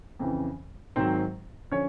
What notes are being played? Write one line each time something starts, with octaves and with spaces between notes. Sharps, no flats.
F2 C#3 E3
G#2 D#3 F#3 C4 C5
D3 F3 C#4 C#5